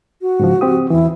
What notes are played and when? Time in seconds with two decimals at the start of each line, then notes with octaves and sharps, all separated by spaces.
0.22 F#4
0.40 G#2 C#3 F3
0.61 C4 G4 D#6
0.90 E2 E3 E4